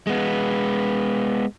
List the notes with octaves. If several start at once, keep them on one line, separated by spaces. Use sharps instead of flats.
G#3 B3